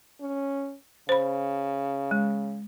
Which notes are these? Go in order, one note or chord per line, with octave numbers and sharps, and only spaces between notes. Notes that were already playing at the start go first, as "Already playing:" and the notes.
C#4
C#3 C5 B5
G#3